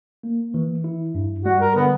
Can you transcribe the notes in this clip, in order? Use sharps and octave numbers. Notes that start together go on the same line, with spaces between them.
A#3
E3
E4
G2
G3 F#4
A#4
D3 B3